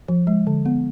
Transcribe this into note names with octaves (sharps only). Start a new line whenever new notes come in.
F3
G#3
D3
B3